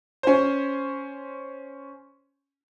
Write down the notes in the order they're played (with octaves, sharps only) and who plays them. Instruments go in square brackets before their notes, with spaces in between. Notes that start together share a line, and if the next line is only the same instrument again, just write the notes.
[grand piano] C#4 C5